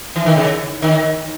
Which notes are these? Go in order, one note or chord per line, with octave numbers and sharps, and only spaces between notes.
E3
D#3
C#3
D#3